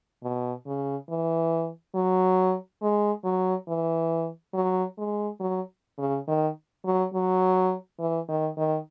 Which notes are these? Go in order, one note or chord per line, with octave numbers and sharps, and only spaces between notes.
B2
C#3
E3
F#3
G#3
F#3
E3
F#3
G#3
F#3
C#3
D#3
F#3
F#3
E3
D#3
D#3